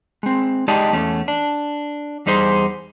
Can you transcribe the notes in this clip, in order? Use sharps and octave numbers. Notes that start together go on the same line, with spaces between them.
G#3 C4
G#3 D#4 G4 D5 D#5 A5
E2 A3 C#4
D4
E2 G3 D#4 G#4 C5